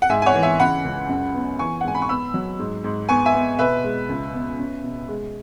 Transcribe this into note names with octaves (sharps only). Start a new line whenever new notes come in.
F#5
G#2 E5 G#5
G#5
C#5 F#5
E3
E5 G#5
C#3 F#5 B5
C#2
F#2
B3
E3 G#5 C#6
F#5
G#2 G#5
B5
C#6
B3 B5 E6
F#3
G#2
G#2
B3 G#5 C#6
E5 G#5
B3
B2 B4 E5
G#3
C#2
B3
C#4
B2
G#3